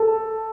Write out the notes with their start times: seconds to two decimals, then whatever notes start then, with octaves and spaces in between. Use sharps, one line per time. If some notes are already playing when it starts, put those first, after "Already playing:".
Already playing: A4